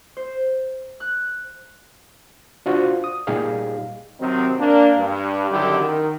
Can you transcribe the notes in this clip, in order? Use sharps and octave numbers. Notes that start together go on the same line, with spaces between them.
C5
F#6
D4 F4 F#4 C5
D#6
A#2 G3 D#4 G4 G#4 F5
C3 D#3 F#3 C4
A#3 D4
G2
F#2 D3 D#3 E4 G4
D#3